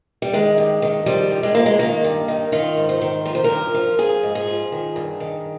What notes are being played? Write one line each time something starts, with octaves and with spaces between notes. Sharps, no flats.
G3
D#3 G#3
G2
D#3
F3 G3
G2
G#3
F3 A#3
G#3
D#3 A#3
G2
D#3
D#3 F4
G#2
C5
D#3
F3 A#4
C5
A#4
G2
F3
F3 G#4
G#2
G#4
F3
D#3
G2
D#3